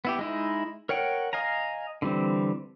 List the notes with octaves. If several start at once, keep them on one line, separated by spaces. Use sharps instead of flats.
B3 E4 G4
G#3 D#4 E4
A#4 C#5 F#5 G5
D#5 F5 G#5 A#5
D3 E3 G3 C4